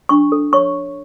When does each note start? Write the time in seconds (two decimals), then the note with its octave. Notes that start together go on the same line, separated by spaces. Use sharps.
0.09 D4 C#6
0.32 A4
0.53 C#5 C#6